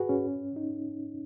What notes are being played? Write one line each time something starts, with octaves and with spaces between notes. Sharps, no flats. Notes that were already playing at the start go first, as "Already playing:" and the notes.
Already playing: F#4 G#4 B4
C#4
D#4